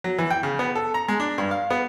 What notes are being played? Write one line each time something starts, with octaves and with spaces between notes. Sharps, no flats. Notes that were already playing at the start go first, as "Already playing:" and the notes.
F#3
E3
G5
C#3
B3
A4
A#5
G#3
D4
G2
F5
B3